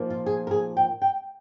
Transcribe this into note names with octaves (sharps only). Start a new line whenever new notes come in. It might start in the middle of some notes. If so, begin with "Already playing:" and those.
Already playing: A#2 F3 A#3 D#4
F4
G#4
A#4
G#4
G5
G5